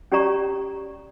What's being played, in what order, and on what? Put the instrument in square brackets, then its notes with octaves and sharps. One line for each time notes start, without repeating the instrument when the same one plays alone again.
[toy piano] C#4 G4 C#5 D5 A#5 C#6